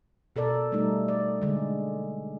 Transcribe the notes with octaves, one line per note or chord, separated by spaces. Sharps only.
B2 A4 A#4 D5
G3 A3 D#4
D5
D3 G#3